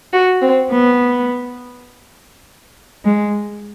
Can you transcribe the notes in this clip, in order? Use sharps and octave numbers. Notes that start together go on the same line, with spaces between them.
F#4
C4
B3
G#3